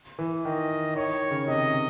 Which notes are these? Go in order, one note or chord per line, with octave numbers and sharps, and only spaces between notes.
E3
D#3 D#5
D#3 C#5
D#3
C#3
C3 D#5
C3